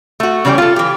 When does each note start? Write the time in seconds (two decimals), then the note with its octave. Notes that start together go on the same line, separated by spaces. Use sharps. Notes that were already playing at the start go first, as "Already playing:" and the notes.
0.20 A3 F#4
0.45 C#3 E3 G3 C#4 G5
0.58 F4 A4
0.76 E3 G4